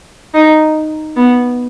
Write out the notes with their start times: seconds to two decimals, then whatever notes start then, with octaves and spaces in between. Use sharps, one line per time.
0.34 D#4
1.17 B3